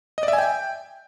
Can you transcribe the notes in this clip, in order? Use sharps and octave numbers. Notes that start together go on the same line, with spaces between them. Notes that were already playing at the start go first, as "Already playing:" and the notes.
D#5
D5
E5
G#5
G5